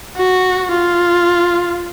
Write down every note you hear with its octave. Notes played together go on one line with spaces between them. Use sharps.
F#4
F4